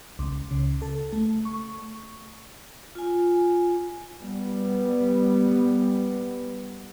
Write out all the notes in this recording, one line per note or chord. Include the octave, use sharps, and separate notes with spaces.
C#2
C#3
A4
A3
C#6
F4 G#5
G3 B3